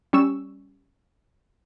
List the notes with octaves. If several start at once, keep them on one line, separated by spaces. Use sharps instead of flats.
G3 C#4 C#6 E6 E7